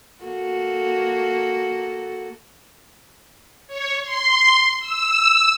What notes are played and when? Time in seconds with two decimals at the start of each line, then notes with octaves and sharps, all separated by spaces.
0.24 A#3 F#4 A4
3.67 C#5
4.03 C6
4.79 E6